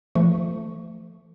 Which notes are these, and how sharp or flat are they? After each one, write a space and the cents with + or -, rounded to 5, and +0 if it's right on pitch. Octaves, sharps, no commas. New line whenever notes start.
F3 -30 A3 +15 C#6 +0